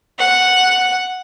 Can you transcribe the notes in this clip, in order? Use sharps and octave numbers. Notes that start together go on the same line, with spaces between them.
F#5